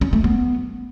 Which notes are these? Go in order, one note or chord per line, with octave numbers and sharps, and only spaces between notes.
C#4
A3
B3